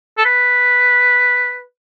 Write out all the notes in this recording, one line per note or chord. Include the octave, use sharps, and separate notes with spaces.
A4
B4